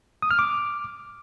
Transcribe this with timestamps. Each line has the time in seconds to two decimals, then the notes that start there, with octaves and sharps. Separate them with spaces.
0.22 D#6
0.31 F6
0.39 D6